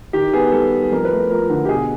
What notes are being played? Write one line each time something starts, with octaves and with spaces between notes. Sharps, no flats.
D#3 G4
B3 G#4
G3 A4
G3
F2 A#4
B4
A3
F3 A#4
D3
G4
B2 G#4